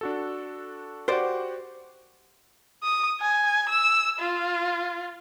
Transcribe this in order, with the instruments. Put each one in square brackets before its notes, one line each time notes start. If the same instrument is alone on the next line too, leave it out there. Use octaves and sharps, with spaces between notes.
[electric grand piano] D4 F#4 A4
[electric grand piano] F#4 G4 F#5 [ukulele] C5 D5
[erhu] D#6
G#5
E6
F4